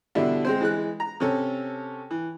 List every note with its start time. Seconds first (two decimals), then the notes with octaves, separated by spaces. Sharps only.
0.15 B2 D3 G3 D4 E4
0.45 G#3 C4 C5
0.61 E3 G#3 F#6
1.00 A#5
1.20 C3 C#4 A4
2.11 E3